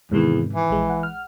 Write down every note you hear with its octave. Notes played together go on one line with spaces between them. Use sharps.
E2 G#2 C3 D#3
E3
A#1 G#3
F#5
F6